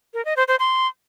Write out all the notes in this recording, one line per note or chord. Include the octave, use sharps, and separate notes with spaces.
A#4
D#5
C5
C5
C6